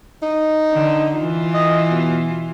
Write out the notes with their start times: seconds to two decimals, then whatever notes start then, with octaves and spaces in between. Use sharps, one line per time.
0.23 D#4
0.72 D3
1.16 E3 F4
1.54 D#5
1.91 B2